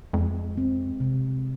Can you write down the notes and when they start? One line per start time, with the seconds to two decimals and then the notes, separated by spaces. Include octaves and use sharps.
0.13 F2 G#3
0.57 C4
1.00 C3